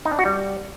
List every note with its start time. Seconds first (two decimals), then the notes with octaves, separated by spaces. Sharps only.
0.05 D#4
0.12 D4
0.19 F#4
0.25 G3